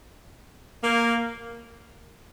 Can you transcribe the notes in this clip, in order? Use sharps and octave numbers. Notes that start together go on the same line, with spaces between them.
A#3